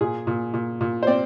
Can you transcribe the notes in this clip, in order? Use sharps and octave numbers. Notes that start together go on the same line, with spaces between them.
A#2 G#4
A#2
A#2
A#2
C5
C4 D5